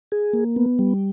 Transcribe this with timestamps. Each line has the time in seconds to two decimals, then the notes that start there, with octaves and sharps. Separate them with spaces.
0.12 G#4
0.33 A#3
0.56 B3
0.79 G3